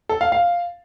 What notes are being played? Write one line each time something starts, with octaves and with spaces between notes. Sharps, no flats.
A4
F5
F5